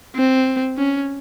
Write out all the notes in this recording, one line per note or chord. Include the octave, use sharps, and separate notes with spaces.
C4
C#4